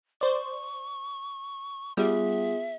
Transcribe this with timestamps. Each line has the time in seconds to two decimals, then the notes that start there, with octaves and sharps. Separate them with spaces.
0.21 C5 D5 C#6
1.97 G3 B3 F4 G#4 E5